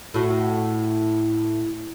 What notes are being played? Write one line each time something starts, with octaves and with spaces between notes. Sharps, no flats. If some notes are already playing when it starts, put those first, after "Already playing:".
A2 F#4